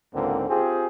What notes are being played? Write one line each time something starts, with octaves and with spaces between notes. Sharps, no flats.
C#2 G#2 D3 A#3 C4
C4 F4 G4 G#4